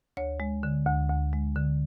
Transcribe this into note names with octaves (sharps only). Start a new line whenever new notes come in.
D2 C#5
G#3
D3
D2
D2
G#3
D3